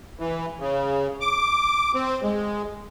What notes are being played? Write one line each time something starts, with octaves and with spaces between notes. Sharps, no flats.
E3
C#3
D6
C4
G#3